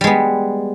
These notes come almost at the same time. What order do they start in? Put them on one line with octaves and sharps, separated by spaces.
G3 G#3 B3